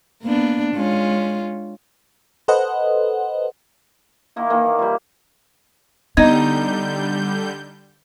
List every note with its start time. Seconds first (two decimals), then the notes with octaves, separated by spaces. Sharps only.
0.23 A#3 B3 D4
0.75 G#3 C#4 F4
2.48 A4 B4 C5 D#5 F#5
4.36 D#3 A#3 E4
4.50 D#3 E3 A#3
4.66 D5
4.79 G3 F4
6.17 D3 G3 B3 D#4 D#5 G6 G#6